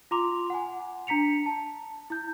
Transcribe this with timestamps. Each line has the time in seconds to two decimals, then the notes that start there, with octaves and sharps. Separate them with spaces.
0.11 F4 A#5 C6 D6 F7
0.50 F#5 G#5
1.07 D4 A#5 B6 C#7 F7
1.46 A5
2.10 E4 G6